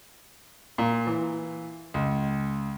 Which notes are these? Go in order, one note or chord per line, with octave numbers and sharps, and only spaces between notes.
A#2
E3
C#2